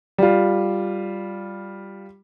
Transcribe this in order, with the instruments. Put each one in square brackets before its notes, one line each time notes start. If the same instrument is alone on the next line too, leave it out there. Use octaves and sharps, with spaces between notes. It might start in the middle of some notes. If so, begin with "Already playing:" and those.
[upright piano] G3 F4